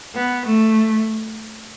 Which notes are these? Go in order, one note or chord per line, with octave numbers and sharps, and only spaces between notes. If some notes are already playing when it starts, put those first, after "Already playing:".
B3
A3